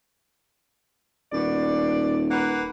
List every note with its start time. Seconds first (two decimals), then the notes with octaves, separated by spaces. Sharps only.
1.32 D#1 B2 D5
2.31 A#3 B4 F#5